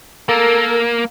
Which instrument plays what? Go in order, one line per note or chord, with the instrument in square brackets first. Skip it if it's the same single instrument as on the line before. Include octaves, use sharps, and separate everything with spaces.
[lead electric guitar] A#3 [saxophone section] A4 A#4